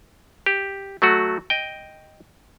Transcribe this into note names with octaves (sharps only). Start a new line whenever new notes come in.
G4
F#3 A3 F#4
D#5 G5